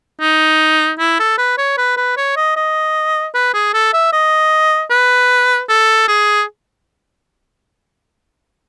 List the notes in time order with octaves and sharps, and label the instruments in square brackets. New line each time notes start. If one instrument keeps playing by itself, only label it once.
[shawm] D#4
E4
A4
B4
C#5
B4
B4
C#5
D#5
D#5
B4
G#4
A4
E5
D#5
B4
A4
G#4